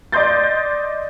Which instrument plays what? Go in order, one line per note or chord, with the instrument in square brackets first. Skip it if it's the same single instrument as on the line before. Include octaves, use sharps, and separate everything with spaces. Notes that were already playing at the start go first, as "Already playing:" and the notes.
[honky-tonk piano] D5 D#5 C6 G6 A6